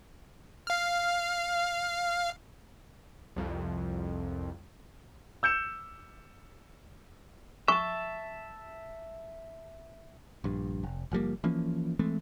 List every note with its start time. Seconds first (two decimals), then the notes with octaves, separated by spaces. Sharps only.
0.67 F5 F6
3.36 C2 F2
5.43 E6 G6 C#7 E7
7.68 E5 A5 C#6
10.44 A#1 G2
10.83 F1
11.12 F#1 F3 G3 A#3
11.44 E3 F3 A#3 C#4
11.99 E3 G#3 A3 C4